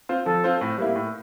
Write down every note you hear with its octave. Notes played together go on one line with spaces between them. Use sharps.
C4 F4 C5
F3 A4
C4 F4 C5
A2
G3 A#3 E4
A2